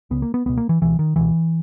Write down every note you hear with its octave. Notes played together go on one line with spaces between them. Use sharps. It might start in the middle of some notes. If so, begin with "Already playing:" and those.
C#2 C#3 B3
A#3
B3
C#2 B2 B3
A#3
E3
C#2 B2 E3
D#3
C#2 B2 E3